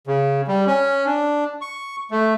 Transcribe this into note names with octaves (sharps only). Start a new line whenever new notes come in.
C#3
G3
C#4
D4
C#6
A3